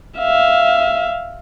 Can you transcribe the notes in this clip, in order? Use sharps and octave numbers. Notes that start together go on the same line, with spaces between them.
E5 F5